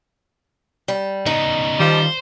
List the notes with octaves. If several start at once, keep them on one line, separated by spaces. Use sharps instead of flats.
G3
C#3 B3 D#4
D#3 F3 G3 C5